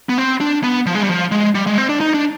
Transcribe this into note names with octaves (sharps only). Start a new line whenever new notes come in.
B3
C4
D4
B3
F3
G#3
G3
F3
G#3
G3
G#3
C4
D4
D#4
D4